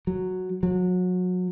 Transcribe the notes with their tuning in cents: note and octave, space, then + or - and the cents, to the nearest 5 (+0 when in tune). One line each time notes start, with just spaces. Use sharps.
F#3 -5
F#3 -30